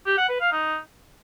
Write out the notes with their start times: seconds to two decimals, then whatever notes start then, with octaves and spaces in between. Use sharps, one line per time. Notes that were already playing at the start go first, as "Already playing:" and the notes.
0.06 G4
0.18 F#5
0.29 B4
0.40 F5
0.52 D#4